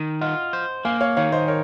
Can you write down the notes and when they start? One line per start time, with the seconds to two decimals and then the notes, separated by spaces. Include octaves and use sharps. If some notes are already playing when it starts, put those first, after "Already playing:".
Already playing: D#3
0.21 F4 D#5 F#5
0.53 C5
0.85 A#3 F5 G#5
1.01 C#5 F5
1.17 D#3 C#5 F5
1.32 C5 D#5
1.48 A#4 C#5